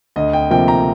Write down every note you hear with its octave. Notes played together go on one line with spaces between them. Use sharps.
D2 D#5
G5
C3 F3 A#3 G5
A#5